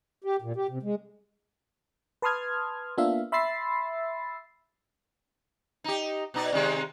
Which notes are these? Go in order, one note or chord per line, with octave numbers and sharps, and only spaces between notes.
G4
A#2
G4
C3
G#3
B4 A5 C6 D#6 F6 G#6
A#3 B3 D4 F4 E5 F5
E5 B5 C6 E6 A6 C7
D#4 G4
B2 D#4 D5
C3 D#3 G#3